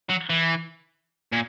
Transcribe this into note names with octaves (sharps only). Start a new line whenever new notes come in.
F#3
E3
A#2